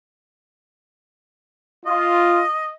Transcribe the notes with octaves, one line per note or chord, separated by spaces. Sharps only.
F4 D#5